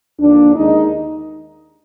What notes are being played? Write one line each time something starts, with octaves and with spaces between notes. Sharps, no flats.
D#2 D3 F3 A#3 D4
D#2 D#3 G#3 D#4